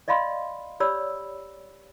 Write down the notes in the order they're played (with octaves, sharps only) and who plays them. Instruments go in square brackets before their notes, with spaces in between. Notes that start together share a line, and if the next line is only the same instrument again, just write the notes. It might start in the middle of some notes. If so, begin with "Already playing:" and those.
[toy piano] D5 D#5 F5 B5 C6
G4 C#5 D5 B5 E6